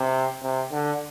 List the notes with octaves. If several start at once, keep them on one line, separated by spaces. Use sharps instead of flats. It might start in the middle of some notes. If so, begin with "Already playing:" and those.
Already playing: C3
C3
D3